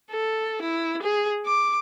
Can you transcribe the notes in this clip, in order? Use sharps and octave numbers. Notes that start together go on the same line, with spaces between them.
A4
E4
G#4
D6